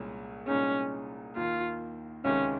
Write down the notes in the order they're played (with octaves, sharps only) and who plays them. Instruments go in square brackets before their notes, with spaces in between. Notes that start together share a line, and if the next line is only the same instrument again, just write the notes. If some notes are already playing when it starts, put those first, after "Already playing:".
Already playing: [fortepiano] C2 A#2 G#3 C#4 G#4
[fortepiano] C2 A#2 G#3 D#4 G#4 [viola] C#4
[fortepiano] D#2 D#3 A#3 [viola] F4
[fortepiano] C#2 C3 D#3 G#3 [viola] C#4